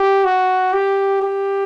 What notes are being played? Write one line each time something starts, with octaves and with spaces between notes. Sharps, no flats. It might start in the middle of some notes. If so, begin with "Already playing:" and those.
Already playing: G4
F#4
G4
G4